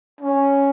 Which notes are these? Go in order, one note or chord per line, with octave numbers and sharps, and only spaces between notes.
C#4